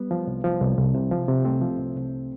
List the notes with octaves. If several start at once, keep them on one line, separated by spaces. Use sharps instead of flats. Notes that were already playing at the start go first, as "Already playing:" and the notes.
Already playing: G3 B3
F3
C2
F3
C2
C2
C3
F3
C3
C2 A3 C4
F3
C2
C2